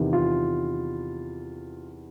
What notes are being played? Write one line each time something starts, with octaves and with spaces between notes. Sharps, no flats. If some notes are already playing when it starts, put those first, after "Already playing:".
Already playing: E2 C3 D#3
F4